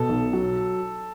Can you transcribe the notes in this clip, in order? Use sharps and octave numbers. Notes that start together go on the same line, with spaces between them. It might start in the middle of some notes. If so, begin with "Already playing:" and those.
Already playing: B2 A4
B1
F#3